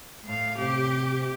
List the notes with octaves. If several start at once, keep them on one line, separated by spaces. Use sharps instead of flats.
A2 F5
C3 G4